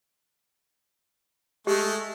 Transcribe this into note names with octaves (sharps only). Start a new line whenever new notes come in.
G#3 A3 G4